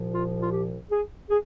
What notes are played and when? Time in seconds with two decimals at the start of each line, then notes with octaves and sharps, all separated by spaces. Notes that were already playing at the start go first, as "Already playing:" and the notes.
Already playing: C2 A#2 F3
0.13 F4
0.41 F4
0.51 G4
0.90 G#4
1.30 G#4